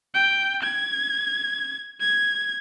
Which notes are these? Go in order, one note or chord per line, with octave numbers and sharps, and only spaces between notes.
G5
G#6
G#6